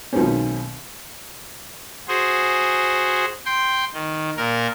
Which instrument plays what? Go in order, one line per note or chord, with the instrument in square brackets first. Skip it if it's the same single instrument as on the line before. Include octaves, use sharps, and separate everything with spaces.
[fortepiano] B1 B2 D#3 G#3 C4 C#4
[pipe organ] F#4 G#4 C5
G5 C6
D#3
A#2 A#4